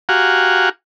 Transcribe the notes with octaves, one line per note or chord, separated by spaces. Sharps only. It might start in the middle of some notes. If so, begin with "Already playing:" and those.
F#4 G4 F5 F#5 G#5 A#5